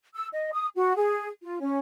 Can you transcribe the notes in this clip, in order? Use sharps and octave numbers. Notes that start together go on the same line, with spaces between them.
E6
D#5
D#6
F#4
G#4
F4
C#4